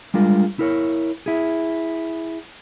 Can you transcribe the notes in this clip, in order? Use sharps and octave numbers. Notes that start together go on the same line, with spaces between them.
G3 G#3 D4 F4 A#4
E4 A#4 C#5
E4 G#4